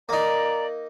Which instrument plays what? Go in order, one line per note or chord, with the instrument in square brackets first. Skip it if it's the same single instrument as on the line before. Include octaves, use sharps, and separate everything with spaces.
[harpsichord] A#3 D#4 [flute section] D5 A#5